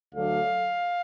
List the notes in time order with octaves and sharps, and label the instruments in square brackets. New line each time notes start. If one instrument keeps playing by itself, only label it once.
[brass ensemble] D2 D3 F#3 A3 D4 F5